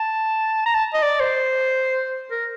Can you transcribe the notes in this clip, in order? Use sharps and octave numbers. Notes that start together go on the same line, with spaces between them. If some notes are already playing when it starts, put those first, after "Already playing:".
Already playing: A5
A#5
A5
D#5
D5
C5
A#4